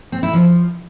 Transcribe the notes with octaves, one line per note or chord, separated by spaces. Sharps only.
C4
E4
F3